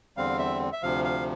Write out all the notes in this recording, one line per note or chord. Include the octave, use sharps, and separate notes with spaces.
E2 D3 G3 C4 F5
E5
E5
D2 C3 F3 F5
F5